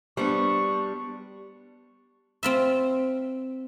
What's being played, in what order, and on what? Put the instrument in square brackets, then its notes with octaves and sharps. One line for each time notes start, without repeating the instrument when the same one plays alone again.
[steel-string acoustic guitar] G3 D4 [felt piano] B3 C5 [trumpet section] C#6
[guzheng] C4 F4 E5